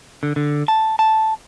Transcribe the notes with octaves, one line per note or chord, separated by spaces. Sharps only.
D3
D3
A5
A5